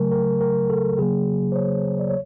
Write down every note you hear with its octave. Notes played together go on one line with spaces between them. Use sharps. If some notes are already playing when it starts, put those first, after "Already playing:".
Already playing: C#3 F#3 A3 A#4
A#4
A#4
A4
C#3 F#3 A#3 G#4
C5
C#5
D5
C#5